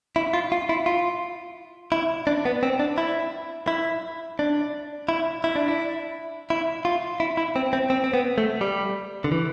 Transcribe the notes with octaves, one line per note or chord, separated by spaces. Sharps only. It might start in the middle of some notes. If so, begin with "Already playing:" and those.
E4
F4
F4
E4
F4
E4
D4
B3
C4
D4
E4
E4
D4
E4
E4
D4
E4
E4
F4
E4
E4
C4
C4
C4
C4
B3
A3
G3
D3
E3